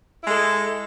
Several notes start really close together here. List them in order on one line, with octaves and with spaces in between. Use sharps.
E4 G#3 A4